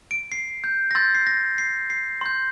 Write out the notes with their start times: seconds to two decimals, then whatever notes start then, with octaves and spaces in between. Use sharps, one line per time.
0.11 D7
0.32 C7
0.64 G6
0.91 A#6
0.95 C6 E6 G6 A6
1.15 C7
1.27 A#6
1.58 C7
1.90 C7
2.21 C6 G6